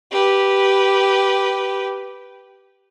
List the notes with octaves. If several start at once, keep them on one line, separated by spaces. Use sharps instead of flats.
G4 B4